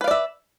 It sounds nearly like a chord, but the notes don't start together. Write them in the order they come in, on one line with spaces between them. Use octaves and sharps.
B4 F5 D5 E5